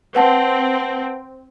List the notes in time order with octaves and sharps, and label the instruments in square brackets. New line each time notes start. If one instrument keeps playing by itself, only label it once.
[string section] C4 [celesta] B4 F#5 A5